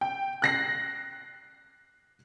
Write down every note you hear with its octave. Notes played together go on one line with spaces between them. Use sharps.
G5
F#6 A#6 C7